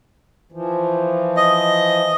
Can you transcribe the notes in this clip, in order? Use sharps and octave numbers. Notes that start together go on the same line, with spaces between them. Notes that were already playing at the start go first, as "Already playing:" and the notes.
E3 F3
D#5